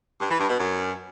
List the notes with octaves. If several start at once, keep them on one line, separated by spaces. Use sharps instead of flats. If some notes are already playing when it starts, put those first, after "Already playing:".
G2
E3
G2
B2
F#2